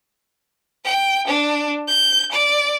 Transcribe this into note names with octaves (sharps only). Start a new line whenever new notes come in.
G5
D4
G6
D5